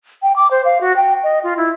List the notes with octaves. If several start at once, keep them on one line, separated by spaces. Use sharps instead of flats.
G5
D6
C5
F5
F#4
G5
D#5
F4
E4